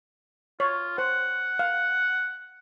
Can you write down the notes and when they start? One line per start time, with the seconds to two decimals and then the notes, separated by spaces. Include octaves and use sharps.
0.60 F4 C#5
0.98 C5 F#5
1.59 F5